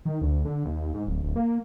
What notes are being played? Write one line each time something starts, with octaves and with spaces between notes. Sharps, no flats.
D#3
D2
D3
D#2
G#2
D1
D1
A#3